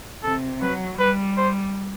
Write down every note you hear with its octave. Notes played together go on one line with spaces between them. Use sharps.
C3 A4
F#3 B4
G3 B4
C5